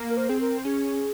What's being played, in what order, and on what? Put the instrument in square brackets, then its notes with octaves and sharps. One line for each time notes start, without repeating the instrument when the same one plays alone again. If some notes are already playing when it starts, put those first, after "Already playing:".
Already playing: [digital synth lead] A#3
[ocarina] A#4
C5
[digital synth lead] C4 [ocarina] G#4
[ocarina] A#4
[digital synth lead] C#4 [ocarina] G#4